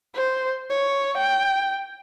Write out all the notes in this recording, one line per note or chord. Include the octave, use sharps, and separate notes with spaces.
C5
C#5
G5